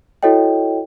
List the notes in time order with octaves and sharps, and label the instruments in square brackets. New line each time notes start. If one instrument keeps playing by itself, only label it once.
[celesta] E4 F#4 A4 C#5 D#5 G5